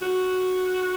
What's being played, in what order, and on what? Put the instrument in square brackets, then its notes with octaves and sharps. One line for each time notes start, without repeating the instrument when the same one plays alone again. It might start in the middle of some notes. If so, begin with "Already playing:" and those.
[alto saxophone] F#4